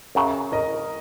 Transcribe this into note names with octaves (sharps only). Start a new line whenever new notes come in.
F#2 C#3 F#3
A#4 D#5